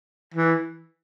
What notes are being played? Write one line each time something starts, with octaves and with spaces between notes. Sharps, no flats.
E3